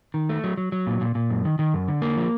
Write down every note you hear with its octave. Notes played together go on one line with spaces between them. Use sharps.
D#3
A3
F#3
F#3
F#3
A#2
A#2
A#2
F#2
D#3
D#3
F#2
D3
A#3
F3